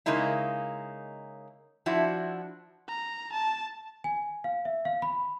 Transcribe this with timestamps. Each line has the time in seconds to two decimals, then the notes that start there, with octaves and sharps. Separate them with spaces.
0.06 C#3 G#3 A#3 D#4 E4
1.86 F3 D4 E4 F#4
2.87 A#5
3.32 A5
4.04 G#5
4.44 F5
4.65 E5
4.85 F5
5.02 B5